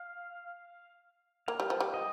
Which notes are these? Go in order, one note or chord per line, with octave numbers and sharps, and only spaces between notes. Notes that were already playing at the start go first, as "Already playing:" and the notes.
Already playing: F5
A#3 F5
G3
F3
G3
D#5